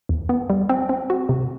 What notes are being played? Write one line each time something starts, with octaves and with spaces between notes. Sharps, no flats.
E2
B3
G3
C4
C4
F#4
C3